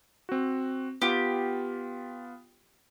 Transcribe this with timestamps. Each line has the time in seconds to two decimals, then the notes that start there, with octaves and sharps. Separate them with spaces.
0.29 C4 F#4
1.02 B3 F4 G4